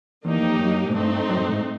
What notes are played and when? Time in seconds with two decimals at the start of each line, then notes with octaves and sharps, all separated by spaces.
0.25 E2 A#3 D#4 G4
0.42 F2
0.59 F#2
0.89 G#2
0.94 G2 A3 C4 D#4
1.29 F#2
1.40 G2
1.52 G#2